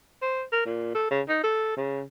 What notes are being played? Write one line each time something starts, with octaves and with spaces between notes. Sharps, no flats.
C5
A#4
A#2
A4
C#3
D#4
A4
C#3